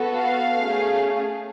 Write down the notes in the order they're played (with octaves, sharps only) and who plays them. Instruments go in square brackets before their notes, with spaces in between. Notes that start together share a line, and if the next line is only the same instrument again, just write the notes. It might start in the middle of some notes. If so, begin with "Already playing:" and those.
Already playing: [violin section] B3 F#4 A4
F5
A3 C#4 G#4